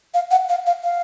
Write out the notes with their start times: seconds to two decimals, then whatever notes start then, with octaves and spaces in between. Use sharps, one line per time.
0.14 F5
0.31 F#5
0.49 F5
0.67 F5
0.83 F5